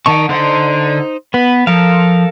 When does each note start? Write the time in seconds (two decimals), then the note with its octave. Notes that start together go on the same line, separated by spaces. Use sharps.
0.06 D#3 D#4 F#5 A5 C#6
0.29 D3 D#4 C5 F#5
1.34 B3 B4
1.67 F3 A4 A#4 F5